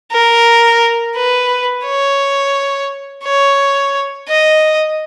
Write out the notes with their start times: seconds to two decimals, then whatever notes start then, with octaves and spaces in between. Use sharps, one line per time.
0.11 A#4
1.15 B4
1.85 C#5
3.24 C#5
4.29 D#5